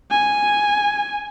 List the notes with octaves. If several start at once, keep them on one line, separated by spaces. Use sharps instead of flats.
G#5